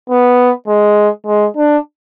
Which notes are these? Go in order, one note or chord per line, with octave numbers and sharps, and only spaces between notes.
B3
G#3
G#3
D4